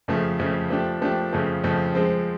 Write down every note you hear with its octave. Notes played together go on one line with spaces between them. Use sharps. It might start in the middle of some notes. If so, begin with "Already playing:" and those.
F2 C#3 F3 A3
F2 C#3 F3 A3
F3 A3 D4 G4
F3 A3 D4 G4
F2 C#3 F3 A3
F2 C#3 F3 A3
F3 G#3 C4